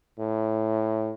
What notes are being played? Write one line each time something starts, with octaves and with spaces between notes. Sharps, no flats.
A2